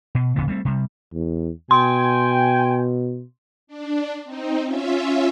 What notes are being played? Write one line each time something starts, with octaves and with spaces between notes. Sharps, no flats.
B2
D1 C#3 E3 B3
G3 A3 B3 C4
C3 G3
E2
B2 G5 G#5 C6
D4
C4 D#4
C#4 F4 E5